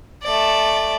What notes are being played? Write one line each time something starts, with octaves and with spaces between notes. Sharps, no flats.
A3 D5